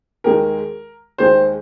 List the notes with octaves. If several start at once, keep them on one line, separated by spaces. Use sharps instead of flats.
D#2 D#3 G#3 A#4
D#2 D#3 G#3 C5